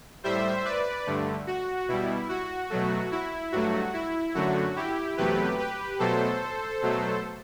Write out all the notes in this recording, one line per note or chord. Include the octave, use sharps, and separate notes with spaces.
A2 G3 C5 E5
B4 D5
G2 D3 A3
F#4
B2 G3 E4
F#4
B2 F#3 A3
E4
G2 F#3 A3 F#4
E4
F#2 D3 F#3 A3 F#4
E4 G4
E2 C3 F#3 A3 G4 B4
G4 B4
B2 F#3 A3 A4 C5
B2 F#3 A3